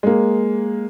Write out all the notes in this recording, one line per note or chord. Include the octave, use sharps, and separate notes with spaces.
G#3 A#3